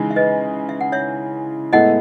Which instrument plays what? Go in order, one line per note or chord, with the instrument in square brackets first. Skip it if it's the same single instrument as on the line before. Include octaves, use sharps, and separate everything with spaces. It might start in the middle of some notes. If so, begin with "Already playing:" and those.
Already playing: [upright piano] C#3 E3 G#3 D#4
[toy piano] E5
B4 D#5
E5
F#5
C#5 E5
[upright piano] A2 G#3 B3 E4 A4 [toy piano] D#5 F#5